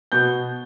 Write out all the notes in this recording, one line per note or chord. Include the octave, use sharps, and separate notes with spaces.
B2 G6